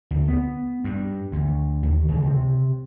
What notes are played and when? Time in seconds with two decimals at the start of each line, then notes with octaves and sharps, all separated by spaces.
0.11 D2
0.28 B3
0.84 G2
1.32 D2
1.83 D#2
2.08 C#2
2.26 C3